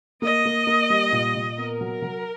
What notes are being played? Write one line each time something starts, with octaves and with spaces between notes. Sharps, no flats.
A#3 D#5
A#3
A#3
G3
A#2
A#2
B3 A#4
F#3
F#3